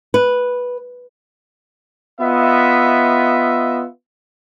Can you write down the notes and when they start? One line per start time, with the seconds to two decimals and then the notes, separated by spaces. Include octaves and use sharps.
0.14 B4
2.21 B3 F4 D#5 E5